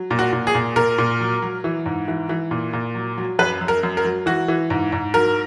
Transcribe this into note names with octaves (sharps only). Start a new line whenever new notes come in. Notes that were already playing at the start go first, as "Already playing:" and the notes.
Already playing: F#3
A#2
F#4
A#2
G#4
A#2
A#2 A#4
A#2
F#3
F#3
E3
G#2
E3
E3
A#2
A#2
F#3
F#3
F#2 B4
F#2
A#4
F#2
A#4
F#3
E3 F#4
E3
G#2
G#2
F#3 A#4